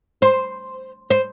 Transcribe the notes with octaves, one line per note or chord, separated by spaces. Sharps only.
C5
C5